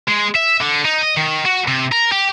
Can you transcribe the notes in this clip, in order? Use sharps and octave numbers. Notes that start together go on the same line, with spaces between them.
G#3
E5
D3
D#4
D#5
D#3
F#4
C3
A#4
G4